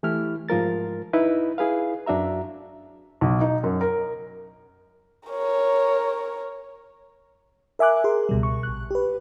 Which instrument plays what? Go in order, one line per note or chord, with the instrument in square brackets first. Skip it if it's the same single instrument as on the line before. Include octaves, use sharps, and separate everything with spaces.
[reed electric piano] E3 A3 E4 G4 F6
G#2 F3 F4 A#4 A6
D#4 E4 B4 D#5
E4 G#4 B4 F5
F#2 D4 F#4 E5 A#5
[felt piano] B1
D#4
F#2
A#4
[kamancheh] A#4 C#5
[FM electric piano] A#4 E5 G#5 D6 F#6
G#4 A#4 C6
C#2 B2 G3
C#6
A#1 F#6
G4 B4